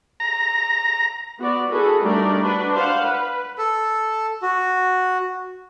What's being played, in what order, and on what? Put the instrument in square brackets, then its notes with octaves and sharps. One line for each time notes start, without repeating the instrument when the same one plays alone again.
[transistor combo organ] A#5
[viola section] B3 F#4 D5
E4 F#4 G#4 A4 B4
G3 A3 D4 D#4 A#4 D5
D4 F#4 B4
C5 F5 F#5
B4
[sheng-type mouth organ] A4
F#4